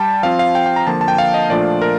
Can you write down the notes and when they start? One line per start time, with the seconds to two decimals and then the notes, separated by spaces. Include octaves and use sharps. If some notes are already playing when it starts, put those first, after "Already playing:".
Already playing: G3 G5 A5
0.23 F3 C4 F4 F5
0.39 F5
0.55 G5
0.66 G5
0.76 A#5
0.87 D3 F3 A#3 A5
1.01 A5
1.08 G5
1.18 F5
1.34 D#5
1.49 A#2 F3 A3 D4 F4 D5
1.82 A#4